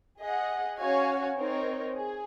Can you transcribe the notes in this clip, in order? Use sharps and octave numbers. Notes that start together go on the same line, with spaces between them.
G#4 D#5 F#5
C#4 F#4 C#5 F5 G#5
C4 D#4 A#4 C#5
G#4